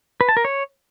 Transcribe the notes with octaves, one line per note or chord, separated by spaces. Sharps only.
B4
A5
A#4
C#5